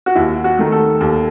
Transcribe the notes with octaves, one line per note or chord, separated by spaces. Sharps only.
F#4
D#2 E4
F#4
D#3 A3
A4
D#2